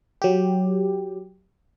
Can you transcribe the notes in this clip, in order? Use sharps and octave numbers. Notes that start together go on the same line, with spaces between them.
F#3 G4